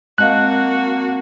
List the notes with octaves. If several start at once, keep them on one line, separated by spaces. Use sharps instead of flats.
G#3 A#3 C4 F#4 D#5 F5 A5 F#6